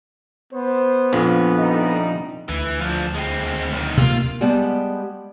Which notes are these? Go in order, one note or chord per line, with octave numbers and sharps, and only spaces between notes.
B3 C5
A#1 F2
G3 A3 D#4
D2 E3
F3 D4
G#3 C4
B1 D#3
C3 A#3 F4
G3 G#3 B3 G4 F#5 A5